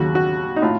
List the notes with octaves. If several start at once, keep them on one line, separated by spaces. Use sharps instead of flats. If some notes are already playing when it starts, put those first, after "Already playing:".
Already playing: D#2 C#3 F#3 F#4
F#4
D#4
A2 F4